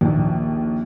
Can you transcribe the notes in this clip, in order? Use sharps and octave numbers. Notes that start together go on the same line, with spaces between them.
A#1 D#2